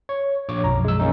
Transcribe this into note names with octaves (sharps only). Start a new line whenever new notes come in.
C#5
A#1 C#5 D6
B1 F#2 F3 A#5
G#3 E6
A#3 C#4 D#4